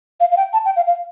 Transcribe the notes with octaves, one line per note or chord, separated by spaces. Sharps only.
F5
F5
G5
A5
G5
F5
F5